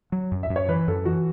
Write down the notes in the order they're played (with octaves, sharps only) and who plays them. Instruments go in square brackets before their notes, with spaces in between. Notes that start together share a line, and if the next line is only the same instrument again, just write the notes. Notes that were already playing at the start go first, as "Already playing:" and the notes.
[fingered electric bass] F#3
F#2
[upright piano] E5
[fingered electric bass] F#2
[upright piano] C#5
[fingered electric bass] E3 [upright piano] B4
[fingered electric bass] F#2 [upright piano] A4
[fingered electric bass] E3 [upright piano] F#4